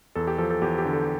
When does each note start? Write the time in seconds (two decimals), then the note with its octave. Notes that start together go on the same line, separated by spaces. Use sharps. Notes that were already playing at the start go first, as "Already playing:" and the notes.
0.15 E2 A4
0.27 G4
0.38 F3 A4
0.50 A4
0.62 E2 G4
0.78 G4
0.85 D3
0.93 A4